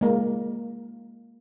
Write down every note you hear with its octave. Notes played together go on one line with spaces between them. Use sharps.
G#3 A#3